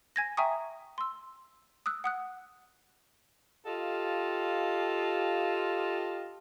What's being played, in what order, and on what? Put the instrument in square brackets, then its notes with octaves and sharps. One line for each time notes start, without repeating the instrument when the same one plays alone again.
[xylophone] G#5 G#6 A#6
E5 G5 G#5 A#5 C#6 D#6
C6 E6
D#6 E6 F#6
F#5 D#6 F#6
[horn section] F4 G4 A4 D#5 F5